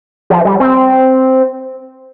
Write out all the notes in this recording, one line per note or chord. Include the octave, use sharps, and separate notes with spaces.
F3
G3
C4